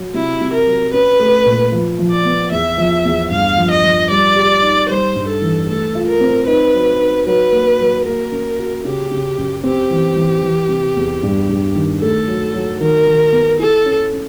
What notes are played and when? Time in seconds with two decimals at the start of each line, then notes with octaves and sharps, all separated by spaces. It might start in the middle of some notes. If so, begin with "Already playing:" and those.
Already playing: F#3
0.14 C3 E4
0.41 C3
0.53 A#4
0.66 F#3
0.93 C#4 B4
1.19 A3
1.45 A#2
1.72 F3
1.99 F3
2.11 D5
2.25 B3
2.51 E2 E5
2.78 F3
3.05 E2
3.30 G2 F5
3.57 F3
3.71 D#5
3.83 F3
4.10 G3 D5
4.36 G4
4.62 D#4
4.89 G3 C5
5.15 G2
5.28 A4
5.42 E3
5.68 A3 A4
5.95 F4
6.08 A#4
6.20 C4
6.47 D#4 B4
6.74 F#3
7.00 D#4
7.26 F#3 B4
7.52 A#3
7.80 F#3
8.05 A#3 A#4
8.32 C#4
8.58 F#4
8.84 C#3 G4
9.11 C#3
9.38 F#2
9.63 C4 G4
9.90 E3
10.16 E3
10.43 E3
10.69 C3
10.96 E2
11.23 G2
11.49 G2
11.75 D#3
12.01 A3 A4
12.28 F#3
12.54 F#3
12.80 D#3 A#4
13.07 D#3
13.32 B3
13.59 E4 A4
13.86 C#4
14.13 C#4